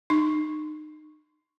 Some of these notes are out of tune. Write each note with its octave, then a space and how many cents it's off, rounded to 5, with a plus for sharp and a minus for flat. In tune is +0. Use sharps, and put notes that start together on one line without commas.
D#4 -30 C#6 -10